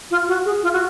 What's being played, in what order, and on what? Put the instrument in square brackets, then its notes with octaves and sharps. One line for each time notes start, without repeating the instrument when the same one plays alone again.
[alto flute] F4
F#4
G#4
F4
F#4